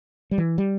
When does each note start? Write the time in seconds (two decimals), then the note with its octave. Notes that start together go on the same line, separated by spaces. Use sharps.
0.31 G3
0.38 E3
0.58 G3